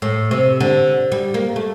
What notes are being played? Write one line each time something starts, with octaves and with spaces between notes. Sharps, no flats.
A2
C3
D3
G3
A#3
A3